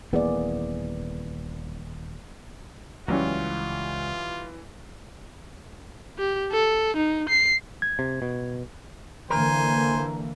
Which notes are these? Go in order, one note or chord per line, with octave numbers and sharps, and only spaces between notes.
D#1 E3 A#3 B3 G#4 D5
C#2 E3 F#3 G3 C#4 F4
G4
A4
D#4
C7
G#6
C3
B2
D3 E3 A#3 A#4 C5 G#5